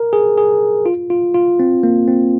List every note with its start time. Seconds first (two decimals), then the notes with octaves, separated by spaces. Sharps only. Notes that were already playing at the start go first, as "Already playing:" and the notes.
Already playing: A#4
0.13 G#4
0.38 G#4
0.86 F4
1.10 F4
1.34 F4
1.59 C4
1.83 A#3
2.08 C4